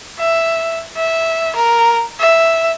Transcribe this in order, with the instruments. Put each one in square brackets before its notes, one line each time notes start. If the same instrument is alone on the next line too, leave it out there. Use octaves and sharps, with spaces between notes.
[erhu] E5
E5
A#4
E5